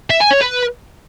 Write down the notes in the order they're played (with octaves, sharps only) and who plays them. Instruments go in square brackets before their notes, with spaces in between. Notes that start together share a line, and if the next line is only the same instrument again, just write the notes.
[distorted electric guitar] E5
G#5
C#5
B4